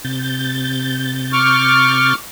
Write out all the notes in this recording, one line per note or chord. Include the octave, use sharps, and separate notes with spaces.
C3 G6 A6
C#6 D6 F6